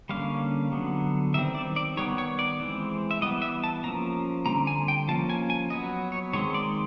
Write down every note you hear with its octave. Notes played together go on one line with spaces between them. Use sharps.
D3 G3 A#3 C#4 F5
D3 F#3 B3
D#3 G3 C4 E5
D5
D5
D#3 G3 B3 C#5
C#5
D5
E3 G#3 C4
E5
E3 G3 B3 D#5
E5
A5
F3 A#3 C#4 A#5
D3 G3 C4 A#5
G#5
G5
F3 A#3 C#4 A5
G#5
G#5
F#3 B3 D#5
C#5
D#3 G#3 C4 C#5
D5